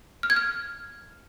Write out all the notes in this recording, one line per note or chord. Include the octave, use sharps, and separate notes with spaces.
F6
G#6
F6